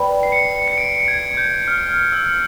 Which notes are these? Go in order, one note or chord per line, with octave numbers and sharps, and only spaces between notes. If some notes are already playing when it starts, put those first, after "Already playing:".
Already playing: B4 D5 G5 B5
C7
C#7
C#7
D7
G#6
G6
F6
E6